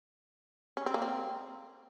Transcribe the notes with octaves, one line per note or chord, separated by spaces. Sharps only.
C#4
C4
A#3
C4